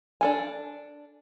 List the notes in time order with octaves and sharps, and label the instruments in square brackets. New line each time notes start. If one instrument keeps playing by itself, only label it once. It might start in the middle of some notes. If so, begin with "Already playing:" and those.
[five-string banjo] D4 A4 G#5